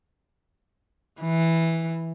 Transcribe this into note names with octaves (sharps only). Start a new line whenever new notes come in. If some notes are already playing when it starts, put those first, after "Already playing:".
E3